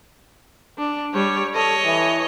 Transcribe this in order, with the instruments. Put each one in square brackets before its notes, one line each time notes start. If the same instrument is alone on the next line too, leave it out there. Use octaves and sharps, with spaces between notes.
[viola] D4
G3 C#5
[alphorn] A4 [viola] C#5 D#5
[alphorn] E3